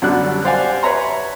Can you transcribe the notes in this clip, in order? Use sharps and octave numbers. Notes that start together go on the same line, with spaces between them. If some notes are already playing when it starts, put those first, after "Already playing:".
F#2 B2 D3 G3 F#6
G4 C5 D5 F5 F#5 G#5
B4 C#5 E5 A#5 C6